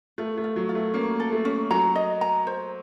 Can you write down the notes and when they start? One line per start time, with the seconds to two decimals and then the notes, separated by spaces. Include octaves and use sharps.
0.18 A3 F4
0.38 A3
0.44 F4
0.56 F#3
0.69 F4
0.75 A3
0.94 A#3 C#4
1.20 A4
1.32 A3
1.45 C#4
1.70 F#3 A#5
1.95 D#5
2.21 A#5
2.47 C5